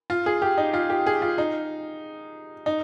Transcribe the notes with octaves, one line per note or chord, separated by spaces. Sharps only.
F4
G#4
G4
D#4
F4
G4
G#4
F4
D#4
D#4